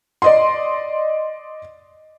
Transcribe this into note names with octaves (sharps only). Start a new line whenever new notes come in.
D5 D#5 C6